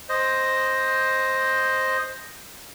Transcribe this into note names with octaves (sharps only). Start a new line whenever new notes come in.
C5 D#5